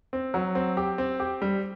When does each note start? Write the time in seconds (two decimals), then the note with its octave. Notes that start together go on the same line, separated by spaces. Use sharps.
0.13 C4
0.34 F#3
0.55 C4
0.77 G4
0.98 C4
1.20 G4
1.42 G3